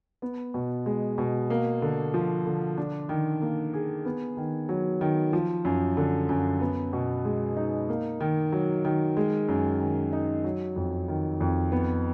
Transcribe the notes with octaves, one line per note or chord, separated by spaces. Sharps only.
B3
B2
G#3
B2
A#3
D3
F3
D3
D4
D#3
A#3
G#4
B3
D#3
F#3
D#3
F3
F#2
D3
F#2
B3
B2
G#3
D#4
A#3
D#3
F#3
D#3
G#3
F#2
D#3
D#4
F#3
F2
D#3
F2
B3